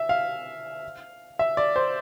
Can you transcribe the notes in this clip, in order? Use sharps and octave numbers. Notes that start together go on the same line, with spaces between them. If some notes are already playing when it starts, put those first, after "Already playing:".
Already playing: E5
F5
E5
D5
C5